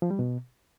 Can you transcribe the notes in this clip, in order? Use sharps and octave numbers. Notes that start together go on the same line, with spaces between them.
F3
G3
B2